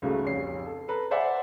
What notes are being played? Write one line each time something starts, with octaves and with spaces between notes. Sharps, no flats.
C#2 G#2 C#3 F#3 A3
F1 A#1 C#5 C7
A4
A4 B4 A#5
C5 D5 E5 F#5 G#5